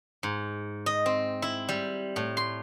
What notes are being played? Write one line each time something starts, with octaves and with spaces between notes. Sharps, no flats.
G#2
D#5
C4
E4
G3
A2
C6